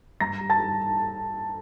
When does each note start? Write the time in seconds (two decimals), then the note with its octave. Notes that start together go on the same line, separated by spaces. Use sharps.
0.20 G2 A#5 A#6
0.41 G3
0.50 A5 A6
0.59 G3